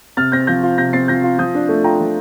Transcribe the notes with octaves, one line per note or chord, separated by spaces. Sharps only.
C3 F6 A6
C4 G6 A#6
F3 G6 A#6
F4
C3 G6 A#6
C4 A6 C7
F3 G6 A#6
F4
F3 D#6 G6
D4
A3
F4 G5 A#5
F3